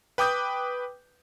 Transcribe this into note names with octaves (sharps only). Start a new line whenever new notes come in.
B4 G5 D6 D#6 G6